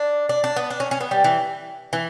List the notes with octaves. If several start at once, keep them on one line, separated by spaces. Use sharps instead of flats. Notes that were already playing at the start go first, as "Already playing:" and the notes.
Already playing: D4
D4
D4
B3
D4
C#4
C#4
B3
G3
E3
E3